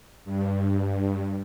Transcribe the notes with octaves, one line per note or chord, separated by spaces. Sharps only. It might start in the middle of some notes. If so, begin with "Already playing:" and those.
G2